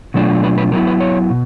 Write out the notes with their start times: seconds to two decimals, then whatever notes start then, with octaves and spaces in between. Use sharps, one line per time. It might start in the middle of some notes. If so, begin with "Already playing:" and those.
0.14 B2 F#3 A3 D4 F4
0.44 B4
0.58 B4
0.72 F#3 B3 E4 A#4
0.87 B4
1.00 C#5
1.30 B2